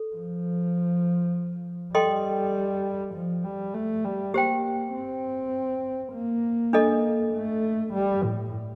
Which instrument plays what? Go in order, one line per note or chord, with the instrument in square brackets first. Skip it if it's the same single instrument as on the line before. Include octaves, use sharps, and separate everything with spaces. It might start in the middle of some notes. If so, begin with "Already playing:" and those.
Already playing: [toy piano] A4
[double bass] F3
[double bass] G3 [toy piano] A4 D#5 G5 C6
[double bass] F3
G3
A3
G3
[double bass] A#3 [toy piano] G4 C5 G5
[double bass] C4
A#3
[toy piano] D4 A4 D#5
[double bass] A3
G3
A2